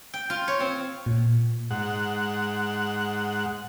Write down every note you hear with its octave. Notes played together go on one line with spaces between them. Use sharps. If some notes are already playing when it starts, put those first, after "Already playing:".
G5
F4
C#5
C4
A#2
G#2 F#5